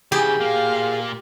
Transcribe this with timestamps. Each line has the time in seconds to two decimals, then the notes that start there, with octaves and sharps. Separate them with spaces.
0.12 C#3 E3 G4 G#4
0.41 A#2 A#3 F5